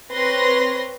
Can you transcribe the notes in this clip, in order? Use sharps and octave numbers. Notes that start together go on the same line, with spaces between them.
C4 B4 C#5 C6 A#6